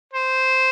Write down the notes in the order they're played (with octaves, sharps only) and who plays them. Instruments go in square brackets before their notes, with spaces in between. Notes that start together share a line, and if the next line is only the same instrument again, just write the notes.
[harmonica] C5